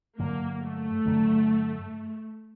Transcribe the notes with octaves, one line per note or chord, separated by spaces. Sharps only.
G2 D3 F#3 A#3
A3
G2 D3 F#3